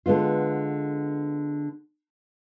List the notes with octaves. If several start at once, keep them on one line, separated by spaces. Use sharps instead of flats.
D3 G#3 B3 F4